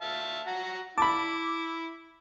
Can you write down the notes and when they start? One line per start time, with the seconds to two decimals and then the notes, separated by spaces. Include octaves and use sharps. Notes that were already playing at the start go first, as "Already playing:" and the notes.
0.02 E5 F5 A5
0.47 F#4 F#5 A#5
0.98 E4 A5 B5 D6